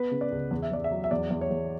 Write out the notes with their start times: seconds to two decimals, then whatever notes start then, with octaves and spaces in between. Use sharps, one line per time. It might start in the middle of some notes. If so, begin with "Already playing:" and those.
Already playing: B3 B4
0.11 C#3
0.21 D5
0.32 C#2
0.51 E2
0.62 E5
0.71 E2 D5
0.84 E5
0.91 F#3
1.04 E5
1.11 E2 D5
1.30 E2
1.41 C#5
1.51 E2